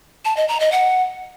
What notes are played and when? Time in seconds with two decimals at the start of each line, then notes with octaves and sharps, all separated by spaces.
0.25 A5
0.37 D#5
0.48 A#5
0.60 D#5
0.72 F#5